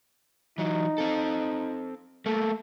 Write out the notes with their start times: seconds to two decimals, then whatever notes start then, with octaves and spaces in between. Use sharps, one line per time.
0.58 E3 F#3 D#4
0.98 C4 A4
2.26 A3 A#3 A4